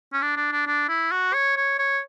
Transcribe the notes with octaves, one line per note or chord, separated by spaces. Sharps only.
C#4
D4
D4
D4
D4
E4
F#4
C#5
C#5
C#5